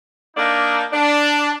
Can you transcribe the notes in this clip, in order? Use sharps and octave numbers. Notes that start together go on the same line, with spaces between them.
A#3 D4 D#4
D4